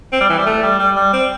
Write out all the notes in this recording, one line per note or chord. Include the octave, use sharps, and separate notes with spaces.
C4
G3
E3
G3
A3
G3
G3
G3
C4